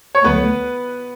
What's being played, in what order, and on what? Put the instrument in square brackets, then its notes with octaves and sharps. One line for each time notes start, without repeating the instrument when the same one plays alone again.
[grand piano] C#5
[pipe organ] D2 D3 F#3 [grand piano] B3 B4